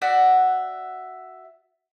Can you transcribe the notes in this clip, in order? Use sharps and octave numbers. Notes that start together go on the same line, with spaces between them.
F#4 D5 E5 F#5